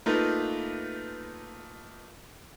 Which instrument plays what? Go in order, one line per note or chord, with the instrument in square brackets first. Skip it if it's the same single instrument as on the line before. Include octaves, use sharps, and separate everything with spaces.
[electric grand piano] A3 A#3 D#4 F4 A#4 B4